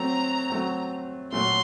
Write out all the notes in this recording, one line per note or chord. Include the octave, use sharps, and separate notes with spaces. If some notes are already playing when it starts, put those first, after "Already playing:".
Already playing: F#3 A3 C4 A#5
F#3 A3 C4
A#2 F#3 A3 C6